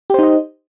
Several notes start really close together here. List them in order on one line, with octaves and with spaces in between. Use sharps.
G4 C5 D#4 D#5